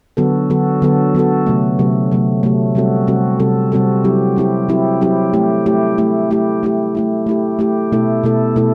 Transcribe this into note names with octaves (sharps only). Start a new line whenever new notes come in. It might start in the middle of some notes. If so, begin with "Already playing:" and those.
D3 F#3 B3 F#4 A4
D3 F#3 B3 F#4 A4
D3 F#3 B3 F#4 A4
D3 F#3 B3 F#4 A4
C3 F#3 A3
C3 F#3 A3
C3 F#3 A3
C3 F#3 A3
C3 G3 C4 F#4 A4
C3 G3 C4 F#4 A4
C3 G3 C4 F#4 A4
C3 G3 C4 F#4 A4
F#3 C4 E4 G4
F#3 C4 E4 G4
F#3 C4 E4 G4
F#3 C4 E4 G4
A3 E4 G4
A3 E4 G4
A3 E4 G4
A3 E4 G4
A3 E4 G4
A3 E4 G4
A3 E4 G4
A3 E4 G4
B2 A3 E4 A4
B2 A3 E4 A4
B2 A3 E4 A4